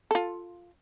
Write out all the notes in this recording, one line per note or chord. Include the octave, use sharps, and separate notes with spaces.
F4 A4